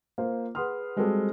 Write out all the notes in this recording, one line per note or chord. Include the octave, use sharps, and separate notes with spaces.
A#3 F4 C5
G#4 B4 F#5 C6 D#6 F6
G3 G#3 C4 F#4 G4 A4